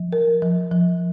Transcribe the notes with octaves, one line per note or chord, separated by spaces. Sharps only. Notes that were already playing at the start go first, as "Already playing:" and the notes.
Already playing: F3
A#4
F3
F3